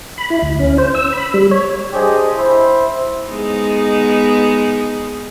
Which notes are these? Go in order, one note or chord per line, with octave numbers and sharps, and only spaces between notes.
B5
E4
D2
C#4
C5
E6
B5
G3
C#5
D4 G4 G#4 C5 D5 D#5
E4 C5 E5
G#3 B3 D#4